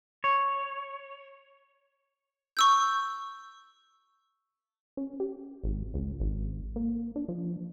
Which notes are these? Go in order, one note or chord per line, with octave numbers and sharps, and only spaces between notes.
C#5
C#6 E6 G6
C#4
G4
G#1
C#2
G#1
A#3
D4
F3